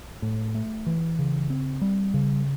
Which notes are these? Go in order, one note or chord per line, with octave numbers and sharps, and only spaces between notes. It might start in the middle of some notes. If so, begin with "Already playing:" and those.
A2
A3
E3
C#3
C4
G3
C#3